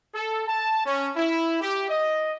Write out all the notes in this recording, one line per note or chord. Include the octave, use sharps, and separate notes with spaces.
A4
A5
C#4
E4
G4
D#5